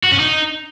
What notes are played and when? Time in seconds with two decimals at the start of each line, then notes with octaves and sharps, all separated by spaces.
0.03 F#4
0.11 C#4
0.19 D#4